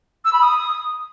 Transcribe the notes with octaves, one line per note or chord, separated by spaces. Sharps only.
E6
B5
D#6